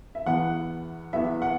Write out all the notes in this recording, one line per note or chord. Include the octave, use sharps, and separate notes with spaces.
E5
E2 E3 B3 F#5
E2 E3 B3 E5
F#5